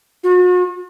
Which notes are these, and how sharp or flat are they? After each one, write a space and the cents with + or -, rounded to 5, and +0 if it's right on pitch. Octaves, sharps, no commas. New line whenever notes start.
F#4 -40